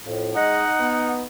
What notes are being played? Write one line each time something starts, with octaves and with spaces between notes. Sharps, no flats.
F2 A2
G#3 D#4 D#5 F#5
B3